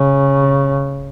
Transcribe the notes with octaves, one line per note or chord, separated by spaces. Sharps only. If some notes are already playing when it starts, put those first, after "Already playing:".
Already playing: C#3